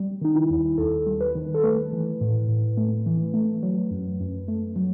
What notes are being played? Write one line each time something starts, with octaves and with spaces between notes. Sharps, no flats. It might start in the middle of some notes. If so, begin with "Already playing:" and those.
Already playing: G3
D#3 D#4
E4
D#2
D#2 A4
G3
B4
D#3
A4
A3 B4
E3
A2
A2
A3
E3
A3
F#3
F#2
F#2
A3
F#3